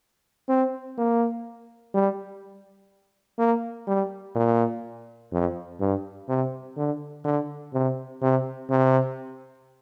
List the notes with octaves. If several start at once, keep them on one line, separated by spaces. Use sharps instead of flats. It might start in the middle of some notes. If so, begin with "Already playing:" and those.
C4
A#3
G3
A#3
G3
A#2
F2
G2
C3
D3
D3
C3
C3
C3